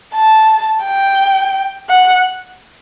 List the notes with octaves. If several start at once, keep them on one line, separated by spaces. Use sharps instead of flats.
A5
G5
F#5